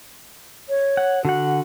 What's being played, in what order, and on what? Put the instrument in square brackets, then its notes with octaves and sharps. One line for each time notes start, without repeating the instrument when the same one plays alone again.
[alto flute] C#5
[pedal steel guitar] F#5
[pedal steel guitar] D3 F#5 [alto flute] F#4